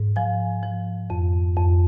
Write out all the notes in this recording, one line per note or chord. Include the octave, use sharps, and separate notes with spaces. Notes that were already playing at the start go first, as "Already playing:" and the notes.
Already playing: G#2
F3 G#5
F3
F2
F2